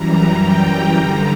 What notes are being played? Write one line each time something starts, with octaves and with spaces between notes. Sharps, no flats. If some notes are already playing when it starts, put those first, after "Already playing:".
Already playing: F#2 E3 G3 A#5
G5
G2 D3 G3 A#5